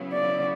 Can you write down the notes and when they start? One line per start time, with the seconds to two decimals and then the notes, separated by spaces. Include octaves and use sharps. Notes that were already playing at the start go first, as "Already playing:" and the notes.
Already playing: C#3 F#3 B3 E4
0.13 D5